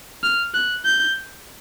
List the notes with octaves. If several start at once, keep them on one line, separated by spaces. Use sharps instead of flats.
F6
F#6
G6